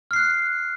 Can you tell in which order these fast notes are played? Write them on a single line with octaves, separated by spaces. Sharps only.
F6 C7 F#6